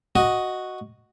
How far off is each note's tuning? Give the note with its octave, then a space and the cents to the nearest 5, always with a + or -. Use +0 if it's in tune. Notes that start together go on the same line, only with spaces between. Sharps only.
F#4 +0 D#5 +0